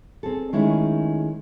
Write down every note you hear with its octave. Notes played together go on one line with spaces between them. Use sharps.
C4 G#4 A4
D#3 G#3 A3 C#4 D#4 E4